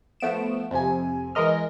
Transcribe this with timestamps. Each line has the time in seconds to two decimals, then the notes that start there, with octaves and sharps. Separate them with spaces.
0.20 F3 A3 B3 D7 E7
0.71 F2 C3 G#5
1.35 E3 G#3 A#4 D#5 F6